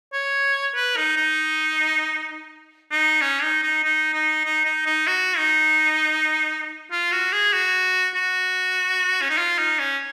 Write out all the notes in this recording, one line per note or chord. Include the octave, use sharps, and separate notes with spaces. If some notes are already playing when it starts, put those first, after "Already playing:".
C#5
B4
D#4
D#4
D#4
C#4
D#4
D#4
D#4
D#4
D#4
D#4
D#4
F#4
D#4
F4
F#4
G#4
F#4
F#4
C#4
D#4
F4
D#4
C#4